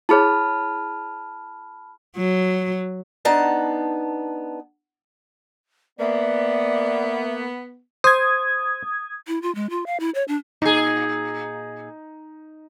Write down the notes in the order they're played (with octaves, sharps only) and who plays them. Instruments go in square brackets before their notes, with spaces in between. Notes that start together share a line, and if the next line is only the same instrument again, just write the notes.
[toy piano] E4 G#4 C#5 [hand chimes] A5 B5 F6
[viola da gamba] F#3
[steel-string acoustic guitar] B3 D4 D#4 A5
[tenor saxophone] A#3 [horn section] B3 [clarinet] D5 [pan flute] E5
[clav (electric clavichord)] C5 [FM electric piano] D#6 G#6
[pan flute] E4
F4
G#3
F4
F5
E4
C#5
D4
[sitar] A#2 G#4 [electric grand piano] D#4